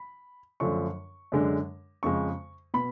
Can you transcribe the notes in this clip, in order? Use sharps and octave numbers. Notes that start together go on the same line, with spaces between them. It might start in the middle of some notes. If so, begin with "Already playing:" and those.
Already playing: B5
F#2 D3 F3 A3 D4 C#6
F#2 D3 G#3 D4
F2 C#3 G#3 C#6
B2 B5